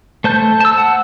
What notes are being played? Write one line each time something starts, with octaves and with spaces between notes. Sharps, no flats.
A3 C5 A5 G6
A5 E6
F#5